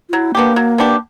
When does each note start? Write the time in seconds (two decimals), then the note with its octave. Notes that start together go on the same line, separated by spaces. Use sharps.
0.09 F4
0.13 F#3 E4
0.35 A#3 B3 D4 G4
0.56 F#3
0.78 B3 D4 G4